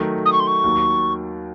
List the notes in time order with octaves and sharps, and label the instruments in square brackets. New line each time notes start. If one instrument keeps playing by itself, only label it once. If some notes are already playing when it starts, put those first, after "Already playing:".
Already playing: [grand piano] D#3 F#3 A3
[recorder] D#6
C#6
C6
C#6
[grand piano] D#2 D#3 F#3